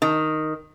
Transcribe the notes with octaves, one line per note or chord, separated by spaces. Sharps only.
D#3